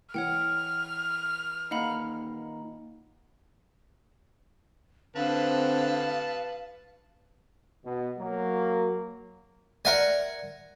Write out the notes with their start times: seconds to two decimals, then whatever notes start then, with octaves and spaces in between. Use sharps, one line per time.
0.14 E3 C#5 F#5 G5 F6
1.71 D#2 A#2 D#4 F5 F#5 B5
5.16 D3 C4 B4 F5 A5
7.84 B2
8.17 F#3 A#3
9.85 A#4 D5 E5 F#5 G#5